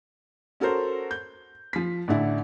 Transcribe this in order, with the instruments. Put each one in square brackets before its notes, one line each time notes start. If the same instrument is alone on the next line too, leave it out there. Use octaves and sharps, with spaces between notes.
[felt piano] C#4 F#4 A4 A#4 C5
G6
F3 B6
A1 D3 E4 D5